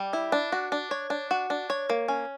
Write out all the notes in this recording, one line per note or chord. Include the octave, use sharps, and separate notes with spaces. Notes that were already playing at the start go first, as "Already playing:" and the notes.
Already playing: G3
E4
D4
F#4
D4
C#5
D4
F#4
D4
C#5
A#3
C#4